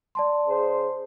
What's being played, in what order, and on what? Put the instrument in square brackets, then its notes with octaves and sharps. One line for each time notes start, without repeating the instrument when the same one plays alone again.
[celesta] D5 A5 C6
[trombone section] C#3 G#4 C5